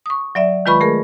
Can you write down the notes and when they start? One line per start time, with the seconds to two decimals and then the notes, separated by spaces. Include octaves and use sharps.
0.06 C#6 D#6
0.35 F#3 D5 E5
0.66 D#3 G#3 F4 B4 B5 C#6
0.81 A3 G#4 A#4